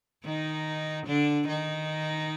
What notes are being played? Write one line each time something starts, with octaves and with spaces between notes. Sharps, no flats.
D#3 D#4
D3 D4
D#3 D#4